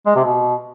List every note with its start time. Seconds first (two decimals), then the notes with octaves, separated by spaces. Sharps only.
0.06 G#3
0.15 C3
0.25 B2